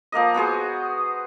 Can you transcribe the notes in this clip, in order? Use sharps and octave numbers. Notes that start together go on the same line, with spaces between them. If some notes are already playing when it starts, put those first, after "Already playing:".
F3 A#3 A#4 D#5
B3 F#4 G#4 C5